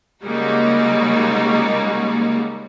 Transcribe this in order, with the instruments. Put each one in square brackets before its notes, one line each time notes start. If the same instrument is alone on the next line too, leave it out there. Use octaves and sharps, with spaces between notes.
[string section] C#3 G3 G#3 A#3 D#4 F#4